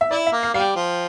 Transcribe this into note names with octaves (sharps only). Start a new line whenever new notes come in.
E5
E4 D5
E5
A#3
F5
G3 F5
G5
F3